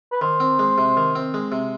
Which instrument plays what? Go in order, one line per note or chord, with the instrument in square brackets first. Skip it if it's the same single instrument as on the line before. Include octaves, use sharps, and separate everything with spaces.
[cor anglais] B4
[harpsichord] D#3 [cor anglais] C5
[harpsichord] C4
G#3
C3
D#3
C4
G#3
C3